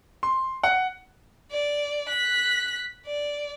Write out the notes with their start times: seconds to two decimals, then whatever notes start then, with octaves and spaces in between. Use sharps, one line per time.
0.23 C6
0.63 F#5
1.51 D5
2.09 F#6 B6
3.06 D5